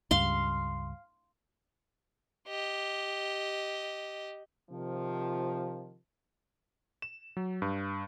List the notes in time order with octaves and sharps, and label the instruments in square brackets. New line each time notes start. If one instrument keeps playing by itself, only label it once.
[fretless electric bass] C#2 G2 [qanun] F5 C6
[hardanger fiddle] G4 D#5
[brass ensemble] C3 D#3 F3
[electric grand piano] E7
F#3
G2